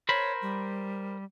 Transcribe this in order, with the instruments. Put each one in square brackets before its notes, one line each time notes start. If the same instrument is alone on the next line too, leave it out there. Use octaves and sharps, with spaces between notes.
[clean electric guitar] A#4 C5 B5 [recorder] C#5
[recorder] G3